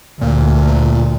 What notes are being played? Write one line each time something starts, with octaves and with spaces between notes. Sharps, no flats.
D2 A#2